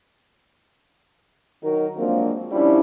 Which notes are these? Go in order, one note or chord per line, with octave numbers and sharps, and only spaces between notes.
D#3 F#3 D#4 A#4
F3 F#3 G#3 A#3 C4 D4
F3 G3 C#4 D4 E4